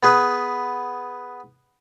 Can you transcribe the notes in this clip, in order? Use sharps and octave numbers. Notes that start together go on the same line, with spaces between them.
B3 G#4 B4